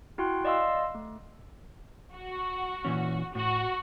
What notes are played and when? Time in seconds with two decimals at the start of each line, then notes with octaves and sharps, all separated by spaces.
0.18 E4 F#4 G5 C6 F#6
0.45 D5 D#5 F5 C6 E6
0.95 A3
2.14 F#4
2.85 A#2 E3 C#4
3.35 A2 F#4